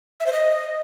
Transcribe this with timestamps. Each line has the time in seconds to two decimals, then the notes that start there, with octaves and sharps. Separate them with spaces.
0.20 E5
0.26 C5
0.33 D#5